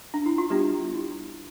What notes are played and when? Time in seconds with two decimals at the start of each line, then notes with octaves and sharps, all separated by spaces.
0.14 D4
0.26 E4
0.38 F4
0.50 G3 B3 D4 G4
0.94 E4